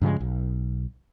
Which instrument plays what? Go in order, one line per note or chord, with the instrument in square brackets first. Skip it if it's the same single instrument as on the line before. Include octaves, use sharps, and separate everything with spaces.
[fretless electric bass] G2 C#3 F3 G#3
B1